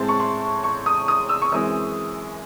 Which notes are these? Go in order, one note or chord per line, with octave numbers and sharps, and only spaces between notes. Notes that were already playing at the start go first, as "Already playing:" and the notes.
Already playing: A2 G#3 C4 A5
C#6
C6
C#6
D#6
D#6
E6
C#6
F#2 E3 G#3 C4 D#6